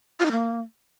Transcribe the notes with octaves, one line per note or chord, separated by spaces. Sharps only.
F4
D#4
A#3